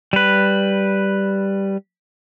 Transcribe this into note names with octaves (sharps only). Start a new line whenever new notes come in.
G3 B4